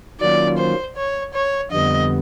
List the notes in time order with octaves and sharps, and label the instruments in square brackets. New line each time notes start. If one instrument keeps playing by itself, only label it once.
[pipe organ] D#3 F#3 A#3 C#4 F4 [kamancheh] D5
[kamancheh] C5
C#5
C#5
[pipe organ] F2 D3 G3 B3 [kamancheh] D#5